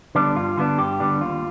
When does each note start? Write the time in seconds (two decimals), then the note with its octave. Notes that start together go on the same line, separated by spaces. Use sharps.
0.15 D3 G3 B3 D4
0.36 G2 F4
0.57 D3 G3 B3 D4
0.78 G2 G4
1.00 D3 G3 B3 D4
1.21 D#2 F4